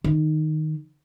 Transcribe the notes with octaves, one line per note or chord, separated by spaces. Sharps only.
D#3